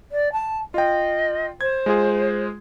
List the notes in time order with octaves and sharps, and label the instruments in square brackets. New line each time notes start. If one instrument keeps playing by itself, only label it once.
[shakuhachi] D5
A5
[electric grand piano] F4 G5 [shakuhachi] D#5
[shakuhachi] C5 [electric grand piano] G#6
[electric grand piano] G#3 F4 G#4